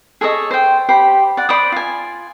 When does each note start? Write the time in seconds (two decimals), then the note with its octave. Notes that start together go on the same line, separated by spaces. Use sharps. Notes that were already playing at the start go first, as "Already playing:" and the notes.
0.21 G#4 A4 C#5 D#5
0.51 C5 G5
0.89 G4 C5 B5
1.37 D5 F#5
1.49 C5 D5 B5 D#6
1.72 F4 G#5